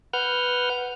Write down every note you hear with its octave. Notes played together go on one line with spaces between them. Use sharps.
B4 F#5 F6 G6